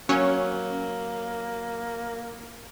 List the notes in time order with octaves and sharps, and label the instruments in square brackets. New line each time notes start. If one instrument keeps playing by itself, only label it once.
[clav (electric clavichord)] F#3 [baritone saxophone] A#3 [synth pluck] C#4 C#5